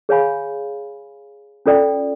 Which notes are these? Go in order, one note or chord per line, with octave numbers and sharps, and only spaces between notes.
G#4 C#5 F5 G#5 B5
C#4 F4 A4 D5 G5